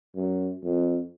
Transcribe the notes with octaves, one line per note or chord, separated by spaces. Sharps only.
F#2
F2